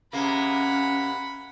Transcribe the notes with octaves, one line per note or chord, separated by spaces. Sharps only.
C3 G#3 A#3 C#4 F#5 B5